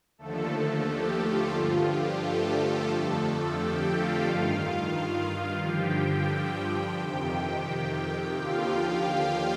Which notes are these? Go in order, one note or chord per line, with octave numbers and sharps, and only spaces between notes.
D#2 D3 F3 A3 A4
A3 A4
G4
F4
G2 D3 F3 F4
G4
A3 A4
F2 D3 F3 A3 A4
G4 G5
F4 F5
G2 D#3 F4 F5
G2 D3 F3 G4 G5
F2 C3 D#3
D#2 D3 F3 F4 F5
F4 F5